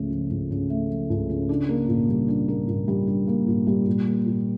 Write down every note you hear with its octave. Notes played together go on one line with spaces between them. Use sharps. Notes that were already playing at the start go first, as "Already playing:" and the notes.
Already playing: C#2 C#3 F3 A3
F3
C#2
C#3
A3
F3
C#2
C#3
D4
A#3
A#2
G3
D4
A#3
A#2
G3
D4
A#3
A#2
G3
A#2
A#3
A#2